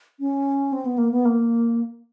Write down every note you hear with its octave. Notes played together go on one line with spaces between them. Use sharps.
C#4
C4
B3
A#3
B3
A#3